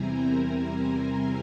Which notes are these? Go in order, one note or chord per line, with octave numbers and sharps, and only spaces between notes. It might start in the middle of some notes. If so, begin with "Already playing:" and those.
Already playing: E2 C3 G3 C4 E4 C5 G#5 A#5
A#4
C5
A#4